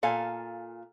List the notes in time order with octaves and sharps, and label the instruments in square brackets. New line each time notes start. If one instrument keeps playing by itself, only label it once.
[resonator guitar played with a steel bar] A#2 A4 F5 G#5